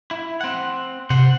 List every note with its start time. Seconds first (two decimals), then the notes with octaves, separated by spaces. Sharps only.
0.11 E4
0.41 C4 F#5
1.10 C3 C5 F#5